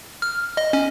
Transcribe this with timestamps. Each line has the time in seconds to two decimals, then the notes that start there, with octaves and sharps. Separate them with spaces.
0.22 F6
0.57 D#5
0.73 C#4